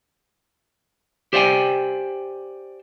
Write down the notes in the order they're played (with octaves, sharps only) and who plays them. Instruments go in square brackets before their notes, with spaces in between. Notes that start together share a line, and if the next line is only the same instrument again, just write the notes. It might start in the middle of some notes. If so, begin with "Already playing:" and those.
[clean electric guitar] G4 C5 D5 F5 G5 G#5